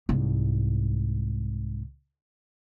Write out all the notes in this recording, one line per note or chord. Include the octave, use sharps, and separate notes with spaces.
C2 G#2